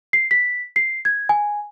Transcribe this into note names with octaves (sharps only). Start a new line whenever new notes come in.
C7
B6
C7
G#6
G#5